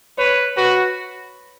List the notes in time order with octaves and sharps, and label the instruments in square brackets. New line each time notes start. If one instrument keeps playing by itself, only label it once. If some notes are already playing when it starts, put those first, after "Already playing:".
[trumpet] B4 [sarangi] C#5
[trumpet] F#4 [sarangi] B4